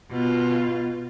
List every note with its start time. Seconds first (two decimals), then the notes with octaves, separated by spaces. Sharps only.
0.11 B2 F4